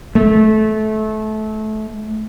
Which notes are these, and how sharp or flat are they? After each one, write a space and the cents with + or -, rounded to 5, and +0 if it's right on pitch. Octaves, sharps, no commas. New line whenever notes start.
A3 -25